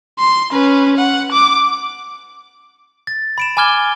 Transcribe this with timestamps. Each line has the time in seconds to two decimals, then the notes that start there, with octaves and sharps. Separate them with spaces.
0.19 C6
0.53 C#4 B4
0.97 F#5
1.32 D6
3.07 A6
3.38 B5 D7 E7
3.57 G#5 B5 D6 F6 G#6 G7